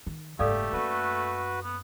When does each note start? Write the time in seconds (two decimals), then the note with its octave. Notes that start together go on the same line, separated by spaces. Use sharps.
0.07 D#3
0.39 F#1 G#2 A3 G4 A4 D5 F5
0.73 F#2 A#3 F#4 B4
1.63 B3